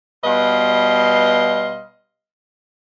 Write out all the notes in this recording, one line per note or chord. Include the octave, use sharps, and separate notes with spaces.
B2 G3 B4 D#5 F5 C6